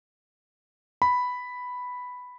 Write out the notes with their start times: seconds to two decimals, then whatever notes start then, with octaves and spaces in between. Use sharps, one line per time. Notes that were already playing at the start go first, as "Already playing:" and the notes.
1.02 B5